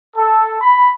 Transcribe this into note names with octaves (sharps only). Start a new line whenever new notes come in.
A4
B5